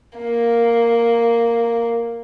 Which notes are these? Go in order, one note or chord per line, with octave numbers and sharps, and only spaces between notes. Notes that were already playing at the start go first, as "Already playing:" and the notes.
A#3